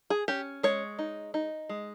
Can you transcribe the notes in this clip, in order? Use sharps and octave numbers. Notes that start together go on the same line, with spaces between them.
G#4
C#4 G4
G#3 C#5
D#4
D#4
G#3